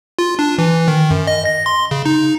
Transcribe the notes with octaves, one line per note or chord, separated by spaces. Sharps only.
F4
D4
E3
D#3
F#2
D#5
A#6
C6
C#3
D#4